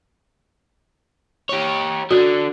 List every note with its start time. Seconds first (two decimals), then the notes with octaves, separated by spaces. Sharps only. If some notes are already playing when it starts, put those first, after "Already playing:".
1.49 G4 C#5
2.11 D3 D4 F#4